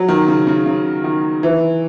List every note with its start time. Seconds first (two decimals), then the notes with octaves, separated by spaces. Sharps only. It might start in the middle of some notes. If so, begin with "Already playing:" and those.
Already playing: F#3
0.08 D#3
0.28 C#3
0.47 C#3
0.66 C#3
1.04 D#3
1.43 E3